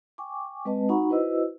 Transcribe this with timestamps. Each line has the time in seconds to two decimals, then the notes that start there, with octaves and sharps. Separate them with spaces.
0.18 G5 G#5 C#6 D6
0.65 G#3 C4 B4 D#5 A5
0.89 D#4 F#4 F#5 A#5 B5 C#6
1.09 E4 F#4 B4 C5 D#5 E6